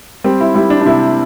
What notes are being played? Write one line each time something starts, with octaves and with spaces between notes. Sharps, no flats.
G3 C4
E4
G3 E4
D4
D4
C3 E4